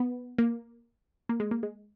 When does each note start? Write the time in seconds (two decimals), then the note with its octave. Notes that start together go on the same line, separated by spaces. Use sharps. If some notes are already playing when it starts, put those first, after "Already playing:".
Already playing: B3
0.38 A#3
1.29 A#3
1.40 G#3
1.51 A#3
1.63 G#3